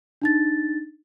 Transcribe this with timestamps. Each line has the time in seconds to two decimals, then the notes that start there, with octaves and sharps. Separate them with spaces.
0.22 D4 D#4 A6